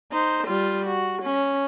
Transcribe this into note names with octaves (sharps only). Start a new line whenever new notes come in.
D#4 C5
G3 F4
F#4
C#4